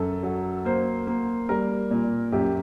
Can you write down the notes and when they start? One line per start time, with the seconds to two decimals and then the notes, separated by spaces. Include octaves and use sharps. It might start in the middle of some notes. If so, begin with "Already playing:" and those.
Already playing: F#2 A4
0.23 F#3
0.65 A#3 C5
1.07 A#3
1.49 G3 A#4
1.91 A#2
2.32 F#2 G4